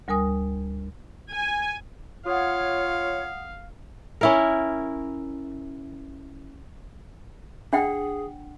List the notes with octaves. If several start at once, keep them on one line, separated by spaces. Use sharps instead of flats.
D2 G3 A#4 G#5 D#6
G#5
F4 C#5 F5 F#5 D#6
C#4 E4 A#4
D4 G#4 F#5 G5